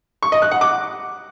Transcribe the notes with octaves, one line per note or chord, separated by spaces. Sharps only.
C#6
D#5
F#6
F#5
D6